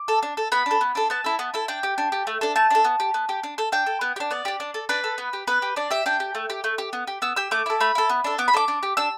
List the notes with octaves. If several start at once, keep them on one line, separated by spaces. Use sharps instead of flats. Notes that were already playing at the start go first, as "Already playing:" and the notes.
Already playing: D6
A4
D4
A4
B3 B5
D4 A4
B3
D4 A4
B3 A5
E4 A4
B3
E4 A4
D4 G5
G4
D4
G4
A3
D4 A4
A3 A5
D4 A4
B3
G4
B3
G4
D4
A4
D4 G5
A4
B3
G4
D4
B3 D5
D4 G4
D4
A4
D4 B4
A4
B3
G4
B3 B4
G4
D4 D5
G4 E5
D4 G5
G4
A3
G4
A3
G4
B3
G4
B3 E6
G4 E6
A3 D6
E4 A4
A3 B5
E4 A4
B3
D4 A4
B3 D6
B5
D4 A4 D6
D4
G4
D4 E6